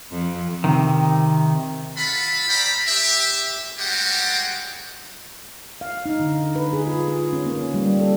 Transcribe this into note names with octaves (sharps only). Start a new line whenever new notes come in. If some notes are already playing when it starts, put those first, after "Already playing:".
F2
C3 D#3
F4 A4 F#5 B5
C5 D5 F5 G5 A#5 B5
G4 E5
G3 G#3 F#4 G4 F#5 G5
F5
D#4
D3
B4
G#4
F4
G#4
C#4
A#3
G3
A4